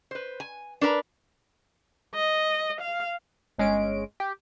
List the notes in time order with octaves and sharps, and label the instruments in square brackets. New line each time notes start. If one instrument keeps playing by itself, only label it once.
[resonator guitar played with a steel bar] B4 C5
G#5
D4 A#4 B4 A#5
[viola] D#5
F5
[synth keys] G1 G#3 C#4 D7
G4